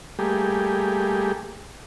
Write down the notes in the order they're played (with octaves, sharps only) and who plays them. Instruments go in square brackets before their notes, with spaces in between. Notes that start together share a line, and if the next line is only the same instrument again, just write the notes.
[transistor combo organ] G3 A3 A#3 G4 G#4